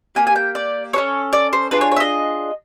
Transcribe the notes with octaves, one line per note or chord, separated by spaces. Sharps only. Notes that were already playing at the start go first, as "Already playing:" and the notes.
A#3 D4 G4 G#5
G#5
G5
D5
C#4 F#4 A4 C#5
D5
C5
D4 F4 G#4 B4
C#5
C#5
E5
D#5